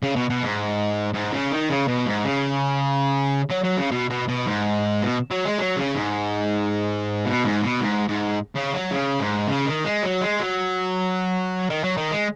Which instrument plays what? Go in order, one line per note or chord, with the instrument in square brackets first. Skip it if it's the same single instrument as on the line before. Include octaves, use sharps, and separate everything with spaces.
[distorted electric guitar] C#3
B2
B2
G#2
G#2
C#3
D#3
C#3
B2
G#2
C#3
F#3
F#3
C#3
B2
B2
B2
G#2
B2
F#3
G#3
F#3
C#3
G#2
B2
G#2
B2
G#2
G#2
C#3
F#3
C#3
G#2
C#3
D#3
G#3
F#3
G#3
F#3
D#3
F#3
D#3
G#3